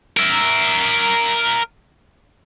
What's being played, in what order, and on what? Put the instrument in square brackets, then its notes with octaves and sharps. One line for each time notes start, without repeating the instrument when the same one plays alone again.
[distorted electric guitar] A#4 E5